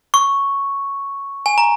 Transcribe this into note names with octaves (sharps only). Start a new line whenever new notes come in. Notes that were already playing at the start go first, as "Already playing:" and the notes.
C#6
G#5
A#5